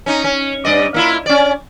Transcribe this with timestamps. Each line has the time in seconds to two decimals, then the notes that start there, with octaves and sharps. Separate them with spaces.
0.06 C#4 D#4
0.24 C#4
0.65 G2 D5 D#5
0.94 A#3 E4 F4
1.26 C#4 D5